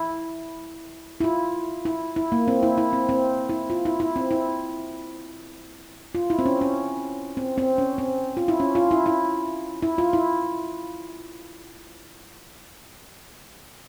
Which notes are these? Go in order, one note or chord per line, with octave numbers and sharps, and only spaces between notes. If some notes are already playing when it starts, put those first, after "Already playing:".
Already playing: E4
E4
F4
E4
E4
A#3
C4
E4
E4
C4
C4
E4
F4
E4
E4
C4
E4
F4
E4
C4
C#4
C#4
C4
C4
C#4
C4
F4
E4
C#4
F4
E4
E4
E4
F4
E4